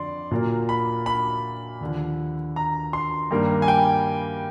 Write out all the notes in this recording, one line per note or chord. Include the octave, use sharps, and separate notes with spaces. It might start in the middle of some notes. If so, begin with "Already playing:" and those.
Already playing: F2 D3 D5 C6
A#2 F#3 A#3
B5
B5
D#2 D3 F3
A#5
C6
G2 D#3 G3 A#3
G#5
G5